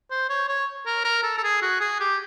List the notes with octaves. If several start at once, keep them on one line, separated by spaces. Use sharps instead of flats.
C5
C#5
C#5
A#4
A#4
A4
A4
G#4
F#4
G#4
G4